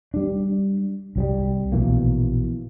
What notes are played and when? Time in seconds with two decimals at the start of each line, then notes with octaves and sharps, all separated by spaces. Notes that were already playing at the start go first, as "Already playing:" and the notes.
0.14 G3 D4
1.16 C2 F#3 G3
1.72 A#1 B2 E3 A#3